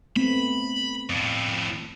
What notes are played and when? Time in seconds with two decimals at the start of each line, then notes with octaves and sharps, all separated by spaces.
0.16 A3 B3 C4 B5
1.10 F2 A2